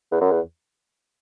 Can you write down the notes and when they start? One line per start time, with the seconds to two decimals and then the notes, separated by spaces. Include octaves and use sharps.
0.11 E2
0.21 F#2
0.31 E2